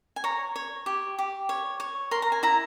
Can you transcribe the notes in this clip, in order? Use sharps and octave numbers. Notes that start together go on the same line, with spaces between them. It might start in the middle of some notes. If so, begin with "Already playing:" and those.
G#5
C#5 A#5
C#5
G4
G4
C#5
C#5
A#4 C6
A#5
G#5
E4 A#5